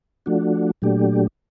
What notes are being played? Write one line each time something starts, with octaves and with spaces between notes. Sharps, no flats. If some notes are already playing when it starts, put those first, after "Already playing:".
F3 A3 D4 F#4
A#2 F#3 A3 D4 G4